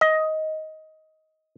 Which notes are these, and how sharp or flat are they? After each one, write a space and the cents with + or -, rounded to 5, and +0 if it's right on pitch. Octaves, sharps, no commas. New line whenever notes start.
D#5 +15